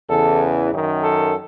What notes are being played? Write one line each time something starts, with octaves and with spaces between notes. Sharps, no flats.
E2 C#3 E3 A4
F#2 D#3
A4